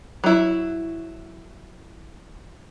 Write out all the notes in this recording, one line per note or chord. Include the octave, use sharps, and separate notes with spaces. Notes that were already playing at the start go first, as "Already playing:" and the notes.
F#3 E4